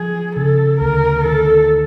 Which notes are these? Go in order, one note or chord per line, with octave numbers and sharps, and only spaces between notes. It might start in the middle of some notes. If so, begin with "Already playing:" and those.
Already playing: F3 G#4
C#3 A4
D2 A#4
D#3 A4